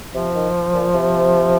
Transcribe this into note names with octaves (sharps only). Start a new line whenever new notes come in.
C3 F3
D#3
A#2
C3